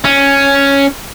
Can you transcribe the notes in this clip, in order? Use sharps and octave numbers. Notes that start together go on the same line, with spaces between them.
C#4